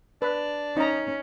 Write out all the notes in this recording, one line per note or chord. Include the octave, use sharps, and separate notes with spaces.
D4 B4
C#4 D#4 A#5